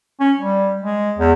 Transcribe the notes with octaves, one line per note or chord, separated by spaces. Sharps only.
C#4
G3
G#3
E2